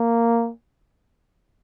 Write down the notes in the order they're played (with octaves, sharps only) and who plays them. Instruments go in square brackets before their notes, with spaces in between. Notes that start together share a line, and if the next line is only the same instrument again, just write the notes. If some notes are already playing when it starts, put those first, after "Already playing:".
Already playing: [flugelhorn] A#3